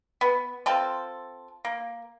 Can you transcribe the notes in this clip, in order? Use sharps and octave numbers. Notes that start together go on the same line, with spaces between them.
B3
C4 F4 A4
A#3